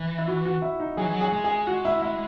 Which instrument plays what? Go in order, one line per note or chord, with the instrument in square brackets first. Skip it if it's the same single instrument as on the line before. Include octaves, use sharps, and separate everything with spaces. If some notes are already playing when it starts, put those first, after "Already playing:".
Already playing: [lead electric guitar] E3
[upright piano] E4
F#4
F#4
E4
D#4
[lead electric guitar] F#3 [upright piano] G#4
[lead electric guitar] E3
F#3
[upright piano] G#4
[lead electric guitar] G#3
[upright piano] G#4
F#4
E4
E4